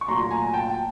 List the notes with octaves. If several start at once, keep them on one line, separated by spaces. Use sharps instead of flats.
C#6
A#2 F#3 A3 A#5 C6
G#5 A#5
G5 A5